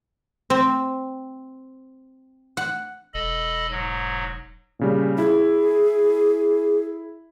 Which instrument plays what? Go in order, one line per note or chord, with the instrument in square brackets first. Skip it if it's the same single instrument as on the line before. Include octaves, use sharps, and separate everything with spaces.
[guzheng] C4
F#5
[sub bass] E1 [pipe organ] A4 D#5 B5
[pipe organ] G#2 F#3
[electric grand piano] A#2 C#3 G3
[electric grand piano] E4 [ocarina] G#4